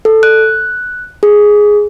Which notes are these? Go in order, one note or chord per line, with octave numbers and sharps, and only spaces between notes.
A4
F#6
G#4